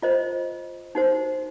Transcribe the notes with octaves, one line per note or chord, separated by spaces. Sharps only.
F4 C5 D#5
D#4 F#4 C5